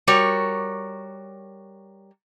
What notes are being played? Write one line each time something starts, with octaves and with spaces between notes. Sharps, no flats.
G3 F#4 A#4 C#5